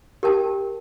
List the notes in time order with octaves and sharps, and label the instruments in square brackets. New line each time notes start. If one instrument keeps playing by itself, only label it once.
[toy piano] G4 A#4 G5 A5